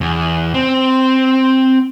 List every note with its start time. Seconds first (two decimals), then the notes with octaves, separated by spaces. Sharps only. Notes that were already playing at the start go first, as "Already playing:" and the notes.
0.01 E2
0.54 C4